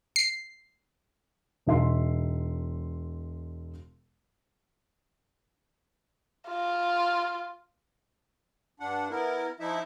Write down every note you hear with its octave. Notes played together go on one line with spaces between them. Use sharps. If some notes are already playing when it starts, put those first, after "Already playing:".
C7
E1 D#4 E5 C6
F4
G2 D4 F#5
B3 E4 A#4
F3 D#4 E4 E5